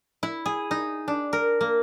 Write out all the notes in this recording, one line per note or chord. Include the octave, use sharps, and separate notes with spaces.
E4
G#4
D#4
D4
A#4
A#3